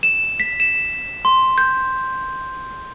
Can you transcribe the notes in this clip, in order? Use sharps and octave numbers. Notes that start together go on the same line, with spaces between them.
E7
B6
E7
C6
G6